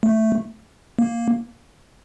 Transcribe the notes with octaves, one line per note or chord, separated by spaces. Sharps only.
A3
A#3